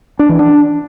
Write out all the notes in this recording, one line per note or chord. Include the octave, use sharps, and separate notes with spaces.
D4
E3
D4